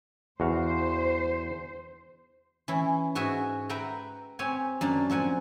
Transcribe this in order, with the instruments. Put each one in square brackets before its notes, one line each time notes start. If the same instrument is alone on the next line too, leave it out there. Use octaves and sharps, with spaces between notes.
[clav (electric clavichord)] E2 F#4 F5 [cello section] C5
[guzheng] E3 C#4 E4
G#2 F#4 D#5 E5 G#5
B4 E5 F#5 G5 A#5
C4 G4 C#5 G#5
F#2 A#3 D4
F3 C4 F#5 G#5